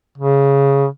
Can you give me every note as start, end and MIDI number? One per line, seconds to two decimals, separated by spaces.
0.18 0.86 49